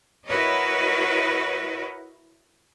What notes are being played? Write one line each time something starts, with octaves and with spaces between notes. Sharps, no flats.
E4 F#4 A#4 B4 C#5 D#5